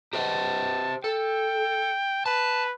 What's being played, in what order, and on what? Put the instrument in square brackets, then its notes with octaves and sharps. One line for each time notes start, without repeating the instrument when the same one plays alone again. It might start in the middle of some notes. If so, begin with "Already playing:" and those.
[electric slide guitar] G4 C5 D#5 [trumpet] A5
[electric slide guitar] A4 [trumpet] G5
[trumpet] B4 [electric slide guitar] A5